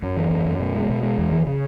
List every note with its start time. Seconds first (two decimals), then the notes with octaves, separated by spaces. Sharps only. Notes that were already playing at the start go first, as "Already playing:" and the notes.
0.02 F#2
0.17 E3
0.31 F#2
0.45 F#2
0.60 B2
0.74 G#3
0.89 B2
1.03 G#3
1.18 E2
1.32 E3
1.46 C#3